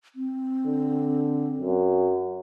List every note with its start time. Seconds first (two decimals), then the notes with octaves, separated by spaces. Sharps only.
0.16 C4
0.67 D3
1.60 F#2